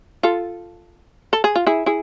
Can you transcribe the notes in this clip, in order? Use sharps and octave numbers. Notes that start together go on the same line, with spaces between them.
F4 A4
A4
G#4
F4
E4 G#4
E4 G#4